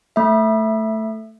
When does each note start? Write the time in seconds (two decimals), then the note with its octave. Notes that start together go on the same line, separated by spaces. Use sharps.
0.16 A3 E5